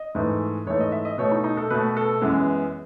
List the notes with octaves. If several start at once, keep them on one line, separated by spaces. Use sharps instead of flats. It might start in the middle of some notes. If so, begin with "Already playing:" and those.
Already playing: D#5
G#2 E3 A3
G#2 E3 A3 C#5
D#5
E5
D#5
B2 A3 C#5
D#4
D#4
A4
B2 A3 B4
A4
F#2 E3 G#3 B3